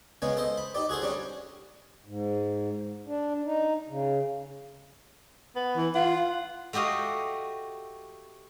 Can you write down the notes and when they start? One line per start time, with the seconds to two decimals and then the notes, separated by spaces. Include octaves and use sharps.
0.22 C#3 G#3 B3 C#4
0.37 A4 C5 D#5
0.57 B5
0.75 D#4 G4 D5
0.89 F#4 G#4 A4 C5
1.02 F#3 G3 C#4 D4
2.05 G#2
3.07 D4
3.45 D#4
3.89 C#3
5.56 B3
5.77 E3
5.95 F4 F#5
6.73 A3 F#4 G4 D#5 F5